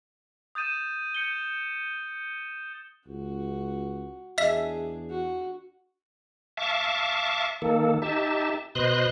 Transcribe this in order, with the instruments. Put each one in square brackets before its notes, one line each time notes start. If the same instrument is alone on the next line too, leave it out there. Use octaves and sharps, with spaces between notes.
[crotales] D#6 G6 A6 D#7 E7
G6 C#7 G7
[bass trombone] C#2 [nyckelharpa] F#4
[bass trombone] E2 [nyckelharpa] D4 G#4 [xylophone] D#5 B6 [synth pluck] E5
[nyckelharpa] F#4
[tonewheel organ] E5 F5 A5 C#6 D6
D#3 A#3 A4
D#4 G4 E5 A5
B2 B4 C5 D#5 C6 F#6